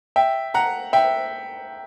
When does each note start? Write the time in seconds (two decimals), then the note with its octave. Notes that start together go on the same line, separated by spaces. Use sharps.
0.16 E5 G5
0.54 F#5 A#5
0.93 E5 G5